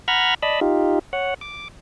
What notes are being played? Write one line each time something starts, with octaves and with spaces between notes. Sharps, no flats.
F#5 A#5 B5 F6 G#6
D5 D#5 A5 B5
D#4 F4 G4
C#5 F#5
D6